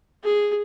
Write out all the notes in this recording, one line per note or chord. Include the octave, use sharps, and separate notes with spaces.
G#4